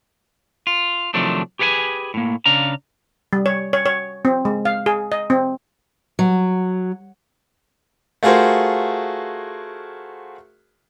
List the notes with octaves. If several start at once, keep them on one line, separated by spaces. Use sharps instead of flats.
F4
C3 D#3 F3 F#3 A3 D4
G4 G#4 B4 F#5 G#5
A2 A#3
C#3 D4 F5 A#5
G3
C#5
C#5
C#5
C4
G#3
F5
G#4
D#5
C4
F#3
A3 F4 F#4 G#4 A#4 C5